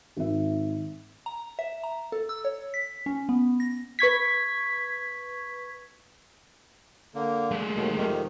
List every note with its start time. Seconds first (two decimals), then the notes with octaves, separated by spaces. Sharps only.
0.16 G#1 E5
1.26 A#5
1.59 E5
1.84 A#5
2.12 A4
2.29 E6
2.45 C#5
2.74 B6
3.06 C#4
3.29 B3
3.60 A#6
3.99 B4 C#6 G#6 B6
7.15 D3 A#3
7.51 G#3 A3
7.76 D#2 B2 D#3
7.95 F2 C3 D#3